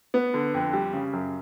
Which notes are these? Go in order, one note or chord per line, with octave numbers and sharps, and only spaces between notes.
B3
D3
F2
G3
C#3
F#2